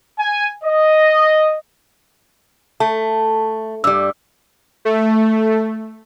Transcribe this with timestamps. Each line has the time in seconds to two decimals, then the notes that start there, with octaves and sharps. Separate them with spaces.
0.19 G#5
0.64 D#5
2.80 A3 A5
3.84 G2 G3 E6
4.85 A3